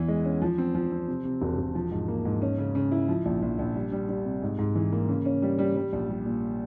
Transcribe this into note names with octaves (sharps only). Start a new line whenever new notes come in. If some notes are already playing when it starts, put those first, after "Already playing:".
Already playing: E2 E3
G#3
C#4
F3
C4
F3
C4
C3
C3
E1
E1
F3
G#2
A#3
G#2
C#4
C#3
C#3
E4
F3
A#1
A#1
A#1
G3
G3
G3
C3
G#2
G#2
E3
A#3
C#3
C#4
G3
G3
G3
A#1
G3
A#2